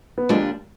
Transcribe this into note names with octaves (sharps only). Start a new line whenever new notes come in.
B3
D#2 D3 F3 G3 G#3 D4 F4